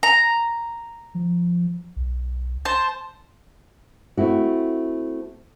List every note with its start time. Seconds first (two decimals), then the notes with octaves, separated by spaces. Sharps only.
0.03 A#5
1.15 F3
1.96 B1
2.65 C5 A5
4.17 A3 C4 E4 F#4